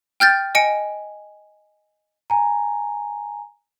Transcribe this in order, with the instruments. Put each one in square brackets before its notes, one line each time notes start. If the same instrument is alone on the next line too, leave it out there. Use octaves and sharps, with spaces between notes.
[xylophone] G5 F6 G6 A6
D#5 G#5 C#7 D7
[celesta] G#5 A#5